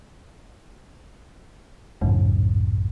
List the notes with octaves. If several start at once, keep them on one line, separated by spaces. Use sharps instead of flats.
G#1 C#2 F#2 A2